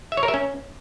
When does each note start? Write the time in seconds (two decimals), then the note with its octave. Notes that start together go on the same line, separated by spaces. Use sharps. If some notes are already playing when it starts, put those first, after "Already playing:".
0.12 E5
0.17 C#5
0.23 A#4
0.28 E5
0.34 C#4